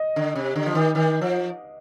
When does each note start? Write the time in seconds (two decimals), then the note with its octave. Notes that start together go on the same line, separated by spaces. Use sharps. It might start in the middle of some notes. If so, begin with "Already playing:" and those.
Already playing: D#5
0.16 D3
0.35 C3
0.56 D3
0.66 F3
0.75 D#3
0.95 D#3
1.21 F3